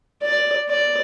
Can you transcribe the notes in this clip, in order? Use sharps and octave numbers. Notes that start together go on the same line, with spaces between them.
D5
D5